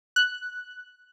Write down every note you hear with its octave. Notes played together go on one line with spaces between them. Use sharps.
F#6